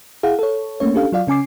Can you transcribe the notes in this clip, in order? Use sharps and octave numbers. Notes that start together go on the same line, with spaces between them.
E4 G#4 F5 F#5
A4 C#5
A3 A#3 C#4 C#5
C#4 D4 G4 A4 F5
F#3 F4 D5 F5
C#3 C#4 G#5 D6 C7